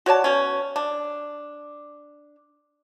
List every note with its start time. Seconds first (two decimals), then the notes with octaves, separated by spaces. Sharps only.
0.06 F#4 C#5 D5 A5
0.24 B2 C#4
0.76 D4